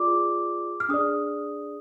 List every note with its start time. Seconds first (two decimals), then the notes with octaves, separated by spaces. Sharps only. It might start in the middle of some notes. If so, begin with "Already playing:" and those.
Already playing: F4 G#4 D5 D6
0.80 F6
0.89 D4 G#4 D5 D#6